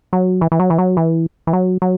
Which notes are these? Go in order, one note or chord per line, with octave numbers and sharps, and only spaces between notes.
F#3
E3
E3
F#3
E3
F#3
E3
E3
F#3
F#3